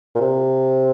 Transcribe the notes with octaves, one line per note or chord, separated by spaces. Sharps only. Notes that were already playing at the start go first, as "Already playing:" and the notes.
A#2
C3